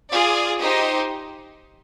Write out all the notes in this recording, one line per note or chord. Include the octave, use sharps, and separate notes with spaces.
F4 G#4 D5
D#4 G4 C5 D#5